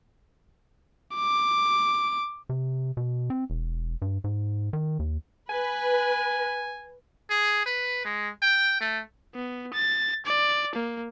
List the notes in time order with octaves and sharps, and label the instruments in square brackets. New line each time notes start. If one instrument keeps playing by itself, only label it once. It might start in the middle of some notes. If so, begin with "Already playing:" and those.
[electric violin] D6
[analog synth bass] C3
B2
C4
E1
G2
G#2
D#3
D#2
[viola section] B4 [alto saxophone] G#5
[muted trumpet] G#4
B4
G#3
G5
A3
[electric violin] B3
A6
D5
A#3